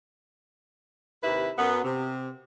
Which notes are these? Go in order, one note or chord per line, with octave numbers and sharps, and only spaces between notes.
D#2 C3 E4 B4
F#2 B3
C3